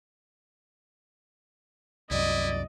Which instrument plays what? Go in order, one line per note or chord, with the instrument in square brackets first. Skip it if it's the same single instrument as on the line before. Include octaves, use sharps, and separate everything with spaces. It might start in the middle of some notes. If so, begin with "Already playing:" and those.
[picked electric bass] C2 F#2 [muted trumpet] E4 [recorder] D5 [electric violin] D#5